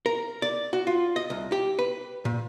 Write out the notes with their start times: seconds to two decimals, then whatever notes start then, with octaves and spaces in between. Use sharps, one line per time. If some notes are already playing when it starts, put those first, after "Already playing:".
0.06 A#4
0.42 D5
0.73 F#4
0.87 F4
1.16 D#5
1.30 C2
1.52 G4
1.79 B4
2.25 A#2